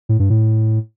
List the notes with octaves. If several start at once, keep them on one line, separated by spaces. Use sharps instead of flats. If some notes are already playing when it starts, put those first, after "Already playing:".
A2
G2
A2